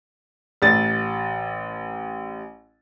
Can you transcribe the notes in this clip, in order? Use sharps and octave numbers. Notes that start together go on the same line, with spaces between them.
A1 A6